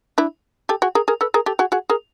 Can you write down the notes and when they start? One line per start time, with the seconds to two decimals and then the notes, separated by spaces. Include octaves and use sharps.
0.18 D4 E4
0.69 G4 A4
0.82 F#4 G#4
0.95 G#4 A#4
1.08 G#4 A#4
1.21 A4 B4
1.34 G#4 A#4
1.46 G4 A4
1.59 F#4 G#4
1.72 F#4 G#4
1.90 G#4 A#4